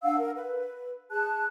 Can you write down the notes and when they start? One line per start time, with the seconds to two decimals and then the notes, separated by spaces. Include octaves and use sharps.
0.03 D4 F5 F#5 E6
0.18 A#4
0.35 B4
1.11 G#4 A5 F#6